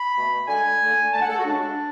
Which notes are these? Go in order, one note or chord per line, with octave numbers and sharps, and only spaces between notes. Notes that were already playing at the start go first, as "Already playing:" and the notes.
Already playing: B5
B2 A3
D3 G#3 G#5
D3 A3
D3 A3 A5
F#5
A4
F#4
C#3 G#3 D4